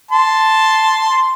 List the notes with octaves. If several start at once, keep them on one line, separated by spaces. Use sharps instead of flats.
A5 C6